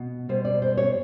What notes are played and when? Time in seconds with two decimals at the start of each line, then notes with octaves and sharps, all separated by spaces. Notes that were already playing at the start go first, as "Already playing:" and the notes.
Already playing: B2
0.29 B2 G3 C5
0.45 D5
0.62 C5
0.77 C#5